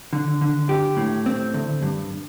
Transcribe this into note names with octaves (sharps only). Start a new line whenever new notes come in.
D3
D3
G4
A2
C4
D2
G2